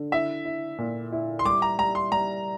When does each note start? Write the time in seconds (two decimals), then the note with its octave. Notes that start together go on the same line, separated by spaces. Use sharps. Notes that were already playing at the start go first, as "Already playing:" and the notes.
Already playing: D3
0.12 E4 E5
0.45 E4
0.78 A#2
1.12 E4
1.39 C6
1.45 G3 D6
1.62 A#5
1.78 G3 A#5
1.95 C6
2.12 G3 A#5